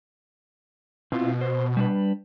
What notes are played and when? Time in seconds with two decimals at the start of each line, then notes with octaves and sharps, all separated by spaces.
1.12 B2 C4 E4 F4
1.41 C5
1.77 G3 D4 B4